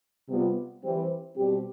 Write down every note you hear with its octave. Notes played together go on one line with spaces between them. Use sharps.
C3 G3 B3 F4
E3 G3 C4
B2 G3 C4 G4